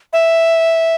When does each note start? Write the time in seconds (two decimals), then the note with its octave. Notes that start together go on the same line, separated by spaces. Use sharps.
0.13 E5